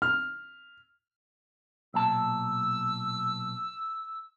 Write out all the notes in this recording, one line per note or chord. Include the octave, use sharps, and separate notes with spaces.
F6
B1 A#2 A5 E6